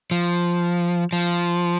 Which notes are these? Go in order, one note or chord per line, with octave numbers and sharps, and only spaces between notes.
F3
F3